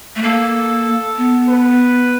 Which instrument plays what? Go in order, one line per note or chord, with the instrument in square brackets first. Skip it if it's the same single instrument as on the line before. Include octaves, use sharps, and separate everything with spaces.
[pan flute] A3
[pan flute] A#3 [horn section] A4
[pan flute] B3
[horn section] B4